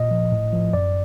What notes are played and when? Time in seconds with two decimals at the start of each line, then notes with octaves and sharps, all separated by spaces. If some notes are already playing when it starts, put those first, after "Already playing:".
Already playing: A#2 D#5
0.11 F3
0.32 A2
0.53 F3
0.73 F#2 D5